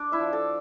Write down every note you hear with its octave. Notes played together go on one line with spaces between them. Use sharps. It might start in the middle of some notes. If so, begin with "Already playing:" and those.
Already playing: D4 D5
E4 E5
F3
A4 A5